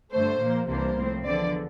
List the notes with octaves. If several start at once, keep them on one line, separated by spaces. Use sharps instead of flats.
G2 D3 A3 C5
A#2 F3 A#3
C2 C3 E3 A#3 D4 C5
A2 F3 C4
E2 D3 F3 D5